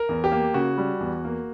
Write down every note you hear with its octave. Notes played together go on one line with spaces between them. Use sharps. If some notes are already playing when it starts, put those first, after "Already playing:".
Already playing: A#4
E2
G4
A#3
C#3 F#4
G3
E2
A#3